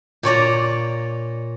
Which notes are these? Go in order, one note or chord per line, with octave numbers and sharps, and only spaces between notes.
A#2 C#5 D5 A#5